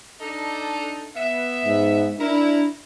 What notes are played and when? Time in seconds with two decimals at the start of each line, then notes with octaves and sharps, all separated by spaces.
0.21 D4 D#4 A4
1.16 B3 E5
1.66 G#2
2.20 D4 E4 A#4